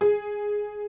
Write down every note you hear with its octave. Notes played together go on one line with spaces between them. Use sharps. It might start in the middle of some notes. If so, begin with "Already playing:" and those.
G#4